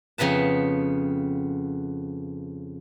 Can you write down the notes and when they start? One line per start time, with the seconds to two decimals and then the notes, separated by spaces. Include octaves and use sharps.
0.18 F2 C#3 B3 B4 A5